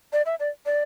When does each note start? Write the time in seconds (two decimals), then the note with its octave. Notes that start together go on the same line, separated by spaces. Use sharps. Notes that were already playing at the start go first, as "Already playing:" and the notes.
0.13 D5
0.26 E5
0.40 D5
0.66 D5